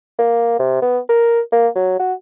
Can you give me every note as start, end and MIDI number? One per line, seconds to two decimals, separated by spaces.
0.19 0.57 58
0.59 0.81 48
0.82 0.99 59
1.09 1.40 70
1.52 1.68 58
1.76 1.96 54
2.00 2.13 66